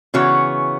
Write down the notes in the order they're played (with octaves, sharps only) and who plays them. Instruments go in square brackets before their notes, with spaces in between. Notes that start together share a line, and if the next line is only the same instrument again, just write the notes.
[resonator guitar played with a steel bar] C#3 E3 B3 F#4 C#5